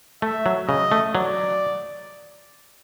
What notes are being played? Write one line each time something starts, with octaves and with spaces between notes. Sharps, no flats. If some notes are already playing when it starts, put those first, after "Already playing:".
A3 E5
F#3
C#3 D#5
A3
F#3 D5